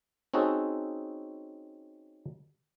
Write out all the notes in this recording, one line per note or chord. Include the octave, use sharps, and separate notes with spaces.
C4 C#4 D#4 F#4 G#4 A4